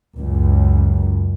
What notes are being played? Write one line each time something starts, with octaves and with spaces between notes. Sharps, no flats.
C#2 F#2